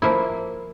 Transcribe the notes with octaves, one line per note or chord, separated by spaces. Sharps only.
F3 A#3 E4